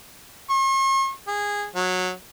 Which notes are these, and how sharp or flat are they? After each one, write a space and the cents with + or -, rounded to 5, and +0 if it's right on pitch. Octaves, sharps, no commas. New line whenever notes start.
C#6 -45
G#4 -15
F#3 -15